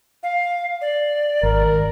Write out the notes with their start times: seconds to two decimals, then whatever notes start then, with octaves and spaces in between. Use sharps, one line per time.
0.23 F5
0.81 D5
1.43 G#1 A#4